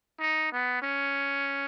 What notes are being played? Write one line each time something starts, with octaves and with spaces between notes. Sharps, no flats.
D#4
B3
C#4